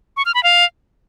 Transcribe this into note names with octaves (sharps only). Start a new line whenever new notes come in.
C#6
F6
B5
F5